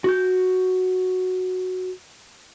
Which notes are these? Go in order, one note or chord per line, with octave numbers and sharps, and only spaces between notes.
F#4 G6